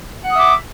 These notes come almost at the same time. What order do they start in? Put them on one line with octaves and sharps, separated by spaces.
F#5 D#6 E5 D6